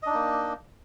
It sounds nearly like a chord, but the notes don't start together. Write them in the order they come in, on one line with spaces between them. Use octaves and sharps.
D#5 D4 D#4 A#3